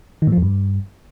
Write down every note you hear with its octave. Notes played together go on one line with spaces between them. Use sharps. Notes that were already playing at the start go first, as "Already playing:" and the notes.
D#3
A2
F3
F2
G2